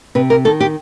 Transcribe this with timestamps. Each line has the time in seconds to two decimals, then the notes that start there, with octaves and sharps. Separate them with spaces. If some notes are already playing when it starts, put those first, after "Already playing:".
0.15 C3 B4
0.30 A#4
0.45 D#3 A4
0.60 G4